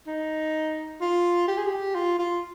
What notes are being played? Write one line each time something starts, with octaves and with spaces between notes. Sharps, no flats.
D#4
F4
G4
G#4
G4
F4
F4